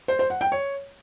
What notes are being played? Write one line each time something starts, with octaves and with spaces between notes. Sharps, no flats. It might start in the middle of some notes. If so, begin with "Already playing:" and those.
C5
C5
F#5
G5
C#5